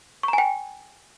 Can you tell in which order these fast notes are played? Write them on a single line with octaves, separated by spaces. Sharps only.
C#6 A#5 G#5 G5